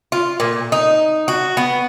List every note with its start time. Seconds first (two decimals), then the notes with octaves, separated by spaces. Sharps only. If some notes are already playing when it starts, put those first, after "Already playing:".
0.12 F4
0.40 A#2
0.72 D#4
1.28 F#4
1.57 B3